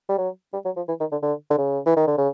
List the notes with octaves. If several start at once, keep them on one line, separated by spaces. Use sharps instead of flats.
G3
F#3
G3
F#3
F3
E3
D#3
D3
D3
D3
C#3
E3
D#3
D3
C#3